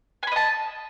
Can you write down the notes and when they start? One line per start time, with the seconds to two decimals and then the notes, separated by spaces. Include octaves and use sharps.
0.23 G#5
0.27 B5
0.32 D#5
0.36 A5